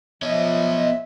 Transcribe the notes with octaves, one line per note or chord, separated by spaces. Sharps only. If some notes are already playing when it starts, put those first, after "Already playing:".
F3 B3 C#5 D#5 E5